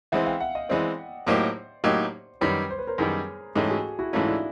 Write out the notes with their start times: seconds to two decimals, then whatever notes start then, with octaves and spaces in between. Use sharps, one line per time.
0.12 E3 G#3 C4 E5 F#5
0.26 F5 G5
0.40 E5 F#5
0.55 D#5 F5
0.69 E3 G#3 C4 D5 E5
1.26 A2 F#3 A#3 D#4 G4 C5 D5
1.84 A2 F#3 A#3 D#4 G4
2.41 F#2 D#3 G3 B4 C#5
2.70 C5
2.79 B4
2.87 A#4 C5
2.98 F#2 D#3 G3 G#4 A#4
3.56 G#2 E3 A3 C#4 G4 A4
3.70 F#4 G#4
3.99 E4 F#4
4.13 G#2 E3 A3 C#4 D#4 F4
4.27 D4 E4